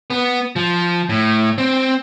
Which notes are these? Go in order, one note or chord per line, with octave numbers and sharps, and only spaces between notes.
B3
F3
A2
C4